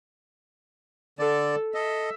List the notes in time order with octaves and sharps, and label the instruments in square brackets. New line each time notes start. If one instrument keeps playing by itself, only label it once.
[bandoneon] D3 D5 [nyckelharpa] A4
[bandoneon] A4 D#5 [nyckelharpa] E5